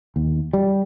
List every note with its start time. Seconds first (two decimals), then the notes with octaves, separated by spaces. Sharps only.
0.16 D#2
0.53 G3